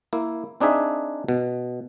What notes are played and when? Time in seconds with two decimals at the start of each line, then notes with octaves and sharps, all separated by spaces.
0.13 A#3 E4
0.60 C4 D4 D#4 G#4 E5
1.29 B2